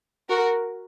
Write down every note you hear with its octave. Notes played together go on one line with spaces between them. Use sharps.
F#4 A#4